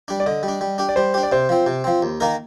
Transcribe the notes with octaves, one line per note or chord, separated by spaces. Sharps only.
G3 D4
D5
D3 D#5
G3
D4
G3
D4 G4
D5
G3 C5
D4 G4
D5
C3 C5
F3 C4
C3
F3 C4
D#2
D#3 A#3 D#4 A#4